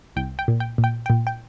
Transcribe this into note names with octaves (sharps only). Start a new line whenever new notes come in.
C2 G5
G5
A#2
G5
A#2
G5
A#2 G5
G5